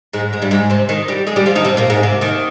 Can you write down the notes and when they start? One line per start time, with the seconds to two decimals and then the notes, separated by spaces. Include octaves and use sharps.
0.13 G#2 G#3
0.33 G#2 G#3
0.42 G2 G3
0.51 G#2 G#3
0.70 C3 C4
0.89 D#3 D#4
1.08 G3 G4
1.27 G#3 G#4
1.36 G3 G4
1.46 F3 F4
1.55 D#3 D#4
1.64 C3 C4
1.77 A#2 A#3
1.90 G#2 G#3
2.03 C3
2.21 D#2 D#3